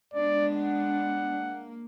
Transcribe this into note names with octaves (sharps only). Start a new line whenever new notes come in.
G#3 B3 D4 D5
F#5
A#3